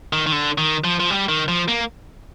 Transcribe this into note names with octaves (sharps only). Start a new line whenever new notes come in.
D#3
D#3
D3
D#3
F3
F3
G3
D#3
F3
A#3